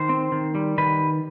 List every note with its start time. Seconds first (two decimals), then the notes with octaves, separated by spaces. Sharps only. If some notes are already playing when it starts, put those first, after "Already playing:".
Already playing: D#3 C5
0.09 C4
0.32 D#3
0.55 G3
0.78 D#3 B4